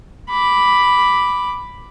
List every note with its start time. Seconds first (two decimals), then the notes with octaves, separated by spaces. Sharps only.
0.30 B5 D6